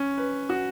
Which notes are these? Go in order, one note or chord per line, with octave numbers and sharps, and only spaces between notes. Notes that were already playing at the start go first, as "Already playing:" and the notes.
Already playing: C#4
B4
F#4